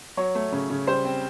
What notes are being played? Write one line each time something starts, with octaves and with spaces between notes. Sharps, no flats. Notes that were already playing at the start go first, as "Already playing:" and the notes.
F#3 C#5
A3
C#3
C#3
G3 C5
C4